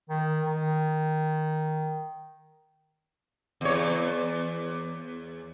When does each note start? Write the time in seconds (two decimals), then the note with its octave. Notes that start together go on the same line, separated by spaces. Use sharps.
0.10 D#3
0.46 D#3
3.61 E2 C#5